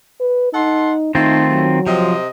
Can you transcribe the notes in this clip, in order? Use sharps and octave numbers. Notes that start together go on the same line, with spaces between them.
B4
D#4 A4 F#5 C6
D#3 A3 C4 D#4 F4
F#3
C3 F3 C4 D#5